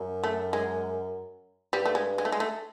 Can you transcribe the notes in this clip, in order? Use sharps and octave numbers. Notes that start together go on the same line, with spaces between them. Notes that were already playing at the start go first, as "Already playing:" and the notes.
Already playing: F#2
A3
G#3
G2 G3
A3
G#3
G#3
A3
G#3
A3